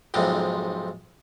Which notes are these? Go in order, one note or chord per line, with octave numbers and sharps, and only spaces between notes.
B1 F2 G#2 C3